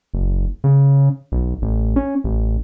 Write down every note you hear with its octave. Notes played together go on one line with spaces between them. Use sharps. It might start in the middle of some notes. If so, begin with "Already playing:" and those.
F#1
C#3
B1
A1
C#4
A1